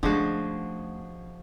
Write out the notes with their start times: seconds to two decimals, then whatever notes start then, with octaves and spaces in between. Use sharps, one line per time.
0.03 D3 F3 G#3 A3 C#4 F#4